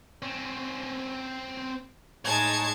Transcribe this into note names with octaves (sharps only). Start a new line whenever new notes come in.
C4 C#4
A2 G#3 D#4 C#5 A5 G#6